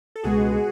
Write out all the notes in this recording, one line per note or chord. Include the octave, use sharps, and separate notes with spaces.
A4
C#2 B2 G#3 B3 F#4 G#4